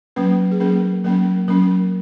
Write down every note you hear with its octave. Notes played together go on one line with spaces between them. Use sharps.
F#3 A#3 C#4 B4
G#4
F#3 A#3 C#4 A#4
F#3 A#3 C#4 A#4
F#3 A#3 C#4 A#4